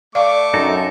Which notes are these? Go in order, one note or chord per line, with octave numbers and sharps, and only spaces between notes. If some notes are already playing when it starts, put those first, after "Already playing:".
A3 D5 F5 C#6 D6
F#2 D#4 A4